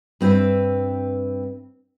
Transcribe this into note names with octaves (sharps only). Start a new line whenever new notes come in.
G2 C4 G4 B4 E5